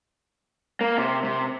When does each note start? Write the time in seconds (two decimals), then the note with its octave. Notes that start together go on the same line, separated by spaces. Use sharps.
0.81 A#3
0.98 C3
1.24 C3